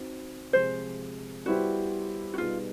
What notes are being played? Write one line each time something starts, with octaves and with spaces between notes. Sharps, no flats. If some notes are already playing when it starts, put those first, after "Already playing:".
Already playing: C4 D#4 F#4
C3 F3 G#3 C5
G3 B3 E4 F#4 G4 C5
F#4
B2 G3 B3 D#4 F4 G#4